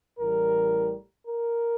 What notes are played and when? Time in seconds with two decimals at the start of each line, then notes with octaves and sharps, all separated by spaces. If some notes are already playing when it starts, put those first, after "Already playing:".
0.19 A1 A2 G3 A#4
1.27 A#4